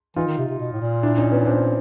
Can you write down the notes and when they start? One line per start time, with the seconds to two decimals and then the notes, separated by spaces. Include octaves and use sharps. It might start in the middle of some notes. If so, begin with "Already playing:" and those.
0.16 E3 D#4 F4
0.27 D#3
0.38 C3
0.49 C3
0.59 B2
0.72 A2
0.81 A#2
1.03 D4 E4
1.18 C#4 D#4
1.32 B3 C#4
1.42 D#4
1.47 C4 D4